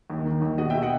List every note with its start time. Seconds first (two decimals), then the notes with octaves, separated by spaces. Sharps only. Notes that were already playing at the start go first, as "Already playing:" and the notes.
0.10 D#2
0.25 D#3
0.42 D#2
0.58 B2 D#5 F#5
0.70 E5 G5
0.75 B2
0.82 D#5 F#5